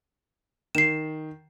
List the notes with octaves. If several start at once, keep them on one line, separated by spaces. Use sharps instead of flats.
D#3 C7 E7